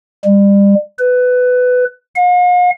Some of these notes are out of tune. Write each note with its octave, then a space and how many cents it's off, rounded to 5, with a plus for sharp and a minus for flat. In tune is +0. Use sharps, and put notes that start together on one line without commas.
G3 +35
B4 +15
F5 +45